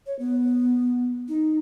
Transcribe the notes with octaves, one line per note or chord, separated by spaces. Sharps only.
C#5
B3
D#4